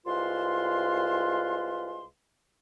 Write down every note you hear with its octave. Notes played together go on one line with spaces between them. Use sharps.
C2 G#3 F4 B4 F5 C6